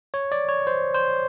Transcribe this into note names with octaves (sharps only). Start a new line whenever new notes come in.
C#5
D5
C#5
C5
C5